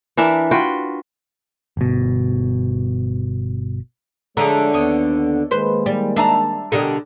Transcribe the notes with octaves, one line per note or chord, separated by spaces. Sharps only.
E3 D4 A#4 E5
F4 F#4 B4 G5
G1 B2
D3 F3 G#3 A3 D4 G#4 C#5 A#5
D#2 B3 C#5 D#5
D#3 G#3 A#3 B4 C5
G3
D4 E5 A5 A#5
B2 D3 G4 A4 A#4 D#5